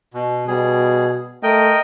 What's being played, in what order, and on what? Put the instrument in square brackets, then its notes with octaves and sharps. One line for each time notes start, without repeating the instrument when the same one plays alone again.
[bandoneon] B2
[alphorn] B2 [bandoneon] G3 G#4
[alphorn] A3 [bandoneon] A#4 D#5 G5